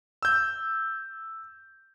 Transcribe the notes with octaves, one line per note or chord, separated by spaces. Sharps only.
E6 G6